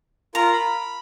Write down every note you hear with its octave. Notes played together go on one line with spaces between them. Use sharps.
F4 A#4 A#5
B5